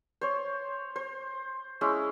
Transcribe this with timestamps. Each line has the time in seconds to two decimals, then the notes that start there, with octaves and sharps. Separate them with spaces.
0.21 C5 C#5
0.96 C5
1.81 G#3 C#4 E4